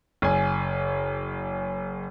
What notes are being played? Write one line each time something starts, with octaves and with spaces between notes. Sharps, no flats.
F#1 G#5